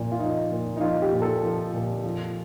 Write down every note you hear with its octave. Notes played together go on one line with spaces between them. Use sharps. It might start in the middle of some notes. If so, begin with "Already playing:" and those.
Already playing: A#2 F3
F4
F3 D#4
A#2
D#4
F3 F4
G4
A#2
A4
F3
A#2
F3